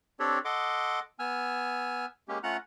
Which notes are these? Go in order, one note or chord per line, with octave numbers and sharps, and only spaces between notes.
C4 D4 G4 A4 C#5 D5
A4 D#5 F#5 C6 D6
B3 G#5 E6 F6
G#3 A#3 C#4 G4
A3 C#4 F4 F#5 A#5 F#6